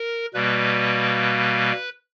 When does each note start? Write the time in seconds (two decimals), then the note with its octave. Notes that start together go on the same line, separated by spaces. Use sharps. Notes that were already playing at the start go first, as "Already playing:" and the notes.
Already playing: A#4
0.34 B2 G3 A#3 B4